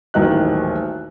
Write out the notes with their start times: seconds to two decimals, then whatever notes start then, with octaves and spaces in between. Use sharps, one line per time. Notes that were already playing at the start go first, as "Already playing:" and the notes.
0.14 D#1 A1 D#3 F#3 D#5 F#6